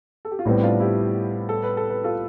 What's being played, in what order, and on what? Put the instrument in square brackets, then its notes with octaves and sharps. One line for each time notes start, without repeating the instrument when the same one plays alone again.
[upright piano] A4
G4
F4
[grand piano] A2 G3 B3 [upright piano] C4 E4
[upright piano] D4 F4
E4 G4
A4
B4
A4
B4
F4 A4